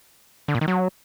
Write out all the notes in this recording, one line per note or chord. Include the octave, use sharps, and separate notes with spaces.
D3
A#2
D#3
F#3